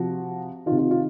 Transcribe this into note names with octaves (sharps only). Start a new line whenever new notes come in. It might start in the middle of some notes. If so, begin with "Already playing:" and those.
Already playing: C3 F3 F#4
D#3 F4
C3
F4
F4